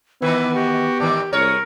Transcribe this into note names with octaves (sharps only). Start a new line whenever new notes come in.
D#3 E3 B3 E4 B4
F#4 G4
G#2 D#3 E3 D5
C2 G#3 A#4 C#5